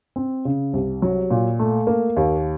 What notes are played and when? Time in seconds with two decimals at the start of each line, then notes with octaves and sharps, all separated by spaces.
0.16 C4
0.45 C#3
0.74 C2
1.02 F#3
1.30 A#2
1.59 A3
1.87 A#3
2.17 D#2